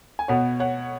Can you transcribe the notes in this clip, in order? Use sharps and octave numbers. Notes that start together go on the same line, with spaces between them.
G#5
B2 B3 C#5 F#5
C#5 F#5